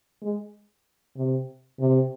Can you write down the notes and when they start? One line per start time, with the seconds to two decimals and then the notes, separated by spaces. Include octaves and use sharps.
0.22 G#3
1.17 C3
1.79 C3